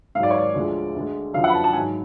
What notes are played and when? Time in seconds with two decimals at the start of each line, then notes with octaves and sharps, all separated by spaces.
0.15 G#2 F5
0.19 F#3 D5
0.30 C#5
0.38 D5
0.54 D2 D3 F3 G#3
0.95 D2 D3 G#3
1.33 F#2 D3 F3 F5
1.44 F#5
1.49 B5
1.54 A5
1.64 A5
1.73 G#2 F#3 G#5